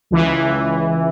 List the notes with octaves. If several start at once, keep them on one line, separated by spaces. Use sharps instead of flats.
C#2 E3